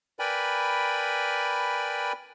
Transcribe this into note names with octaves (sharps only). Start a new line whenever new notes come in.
A#4 B4 D5 G5 G#5 B5